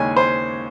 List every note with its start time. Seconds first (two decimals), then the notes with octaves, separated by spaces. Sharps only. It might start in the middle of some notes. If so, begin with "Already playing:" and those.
Already playing: D#2 C#3 G#3 C#4 G#5
0.16 C5